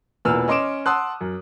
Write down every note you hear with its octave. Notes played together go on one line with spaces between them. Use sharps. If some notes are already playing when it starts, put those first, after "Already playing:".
E1 E2 A#2 B4 E6 F6
C#4 D#5 C6 D6 D7 E7
F#5 A5 C6 D#6 E6 F#6
F#2